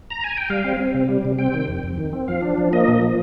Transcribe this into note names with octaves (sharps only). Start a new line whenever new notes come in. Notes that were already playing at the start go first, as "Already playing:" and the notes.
A#5
G#5
G5
G3 F5
C4
C4
C3
G3
C3
C4 G5
D#3
F2
F2
D#3
C4
F3 F5
D4
F3
A#3 D#5
A#2
F3